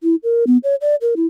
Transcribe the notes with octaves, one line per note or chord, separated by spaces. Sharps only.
E4
A#4
B3
C#5
D5
A#4
E4